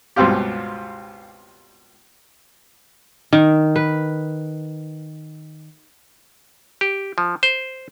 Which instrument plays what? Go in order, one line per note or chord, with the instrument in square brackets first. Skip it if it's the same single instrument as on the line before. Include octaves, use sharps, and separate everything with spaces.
[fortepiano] C#2 G2 B2 C4 F4 G4
[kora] D#3
B4
[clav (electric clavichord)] G4
F3
C5